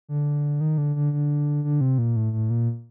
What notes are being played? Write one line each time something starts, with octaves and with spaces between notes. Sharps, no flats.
D3
D#3
D3
D3
D3
D3
C3
A#2
A2
A2
A#2